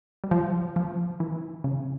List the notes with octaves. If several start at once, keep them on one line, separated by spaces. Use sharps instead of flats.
G3
F3
F3
E3
C#3